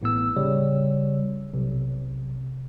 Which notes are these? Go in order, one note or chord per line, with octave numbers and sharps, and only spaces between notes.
A1 A2 B3 E6
C#3 G3 C#5
B1 C3